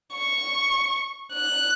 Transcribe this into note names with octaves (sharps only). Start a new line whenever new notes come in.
C#6
F#6